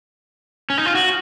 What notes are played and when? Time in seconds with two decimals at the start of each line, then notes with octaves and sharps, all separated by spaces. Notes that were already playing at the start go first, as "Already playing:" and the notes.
0.70 C#4
0.78 D#4
0.86 F4
0.95 F#4